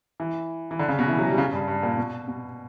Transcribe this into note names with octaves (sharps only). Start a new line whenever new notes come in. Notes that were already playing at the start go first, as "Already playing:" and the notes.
E3
E3
D3
C#3
B2
E3
F#3
G3
C#3
G2
G2
A#2
B2
B2